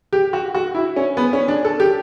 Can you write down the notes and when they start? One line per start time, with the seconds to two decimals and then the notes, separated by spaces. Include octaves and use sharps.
0.13 G4
0.33 F#4
0.54 F#4
0.75 E4
0.96 C#4
1.17 B3
1.33 C#4
1.48 D4
1.65 A4
1.80 G4